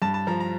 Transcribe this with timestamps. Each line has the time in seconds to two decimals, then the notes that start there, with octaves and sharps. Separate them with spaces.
0.02 G2 A5
0.14 A5
0.27 F3 A#5
0.40 A#5